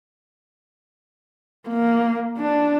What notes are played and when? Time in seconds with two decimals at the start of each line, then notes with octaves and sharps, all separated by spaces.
1.68 A#3
2.38 D4